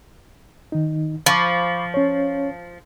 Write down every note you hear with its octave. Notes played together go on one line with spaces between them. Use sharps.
D#3 D#4
F3 B5 C#6 D6
C#4 C#5